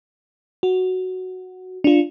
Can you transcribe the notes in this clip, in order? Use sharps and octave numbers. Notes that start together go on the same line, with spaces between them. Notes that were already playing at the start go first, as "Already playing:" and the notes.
F#4
D4 F4